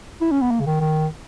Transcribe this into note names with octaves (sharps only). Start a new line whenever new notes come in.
E4
C#4
B3
A#3
C#3
D#3
D#3